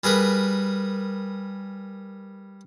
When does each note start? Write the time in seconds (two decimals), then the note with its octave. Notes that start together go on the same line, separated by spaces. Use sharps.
0.04 G3 G#4 A#4 B4